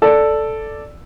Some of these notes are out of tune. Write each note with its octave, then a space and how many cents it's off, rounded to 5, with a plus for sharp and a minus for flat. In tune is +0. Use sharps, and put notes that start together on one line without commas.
A4 +0 D5 +0